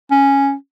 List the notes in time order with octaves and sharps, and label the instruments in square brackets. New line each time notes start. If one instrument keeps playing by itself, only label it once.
[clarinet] C#4